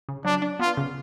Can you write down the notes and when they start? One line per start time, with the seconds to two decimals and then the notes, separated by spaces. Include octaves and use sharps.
0.09 C#3
0.25 F#3 D4
0.42 D4
0.59 B3 F4
0.77 C#3